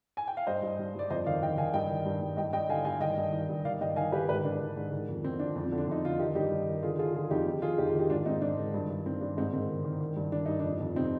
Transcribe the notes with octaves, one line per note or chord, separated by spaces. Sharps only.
G#5
G5
F5
G2 C5 D#5
G2
G2
G2 D5
F2 C5 D#5
D#3 D5 F5
D#3 D#5 G5
D#3 F5 G#5
G2 D#5 G5
D#3
G2
G2
G2 D#5 G5
G2 D#5 G5
D3 F5 G#5
G2 F5 G#5
D#3 D#5 G5
G2
D#3
G2
D#3 D5 F5
G2 D#5 G5
D#3 F5 G#5
D#3 G4 B4
G#2 G4 B4
D#3 D4
D#3
G#2
D#3
F2
D#3 C4
F2 D4
F2
C4
D3
D4
F2 D#4
D3 F4
D#3 D#4 G4
G2 D#4 G4
G2
D#3
D3 F4 G#4
D3 F4 G#4
D3 F4 G#4
F2 D#4 G4
F2
D#3 F4 G#4
F2 D#4 G4
F4 G#4
D#3
D#4 G4
G#2 D4 F4
G#2 C4 D#4
G#2 D4
D#3
G2
G2
D#3 C4
G2 D4
G#2 C4 D#4
D#3 C4
D#3
D#3
D#3
G2
D#3 D4
G2 D#4
F2 D4
F2
C3 C4 D#4